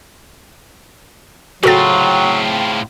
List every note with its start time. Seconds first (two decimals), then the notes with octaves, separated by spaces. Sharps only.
1.63 A2 C#3 F#3 C4 F4 F#4 A4 A6